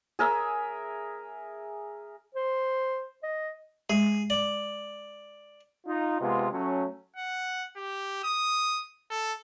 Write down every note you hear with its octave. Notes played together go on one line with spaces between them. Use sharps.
G#4 A#4 E5
C5
D#5
G#3 G#4
D5
D#4 F4
C3 G#3 B3 F4
F#3 A3 C#4
F#5
G4
D#6
A4